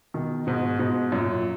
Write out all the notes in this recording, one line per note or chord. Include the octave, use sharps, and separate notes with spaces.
B2 D#3
G#2 B2
G#2 B2
F#2 A#2